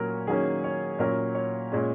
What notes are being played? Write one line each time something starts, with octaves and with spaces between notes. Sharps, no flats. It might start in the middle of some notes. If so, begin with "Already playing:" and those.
Already playing: A#2 F#3 C#4 A#4
D#3 F#3 A#3 C#4 G#4
C#5
A#2 F#3 C#4 A#4
C#5
A#2 G#3 C#4